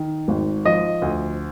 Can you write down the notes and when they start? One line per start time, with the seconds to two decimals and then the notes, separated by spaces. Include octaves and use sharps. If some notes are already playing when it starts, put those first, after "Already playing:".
Already playing: D#3
0.28 G#1
0.65 F3 D#5
1.02 D2